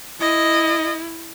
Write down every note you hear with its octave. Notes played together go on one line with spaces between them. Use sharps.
E4 D#5